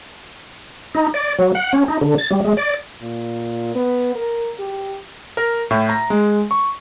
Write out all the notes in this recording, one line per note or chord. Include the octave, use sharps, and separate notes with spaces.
D#4
D5
F#3
F#5
C#4
D#4
D3
A6
G3
G#3
D5
A#2
B3
A#4
G4
A#4
A2
A#5
G#3
C#6